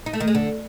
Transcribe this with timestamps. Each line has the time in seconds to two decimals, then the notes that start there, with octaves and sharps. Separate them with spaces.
0.06 D#4
0.13 A3
0.20 D#3
0.28 G#3
0.35 D3